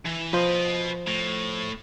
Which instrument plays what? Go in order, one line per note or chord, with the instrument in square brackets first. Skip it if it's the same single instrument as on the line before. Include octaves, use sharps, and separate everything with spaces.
[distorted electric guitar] E3
[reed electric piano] F3 C5 [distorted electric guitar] B4 D#5
[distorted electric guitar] A2